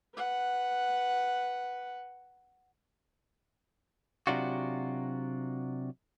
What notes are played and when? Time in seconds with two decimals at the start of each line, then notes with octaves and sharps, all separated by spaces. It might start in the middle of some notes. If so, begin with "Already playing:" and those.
0.15 B4 F#5
4.27 C3 D#3 F#3 D4 F4 F#4